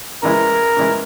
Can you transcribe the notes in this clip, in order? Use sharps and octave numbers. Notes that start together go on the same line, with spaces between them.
C#3 E3 G#3 E4 A#4
C#3 E3 G#3 E4